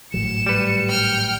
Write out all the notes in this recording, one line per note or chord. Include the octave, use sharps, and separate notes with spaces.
G#1 A2 F#3 C#7 E7
G3 B4
G5 F6